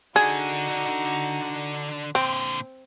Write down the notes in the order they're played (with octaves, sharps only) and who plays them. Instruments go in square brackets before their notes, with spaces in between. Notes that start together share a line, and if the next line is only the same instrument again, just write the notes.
[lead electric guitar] D3 D4 [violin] D#4 F#4 [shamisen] G#4
[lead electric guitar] A#2 D3 [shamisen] C4